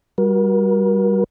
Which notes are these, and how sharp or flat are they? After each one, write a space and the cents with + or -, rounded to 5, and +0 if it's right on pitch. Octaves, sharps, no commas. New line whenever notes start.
G3 +0 F#4 +0 A#4 +35